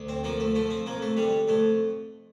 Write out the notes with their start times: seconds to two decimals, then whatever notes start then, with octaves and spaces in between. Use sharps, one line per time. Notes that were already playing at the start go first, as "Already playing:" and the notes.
Already playing: D2
0.08 C4
0.24 F3 A#3
0.40 A3
0.55 F3 A3
0.70 C4
0.86 F2 A#3
1.02 A3
1.17 D3 G3
1.48 F2 A3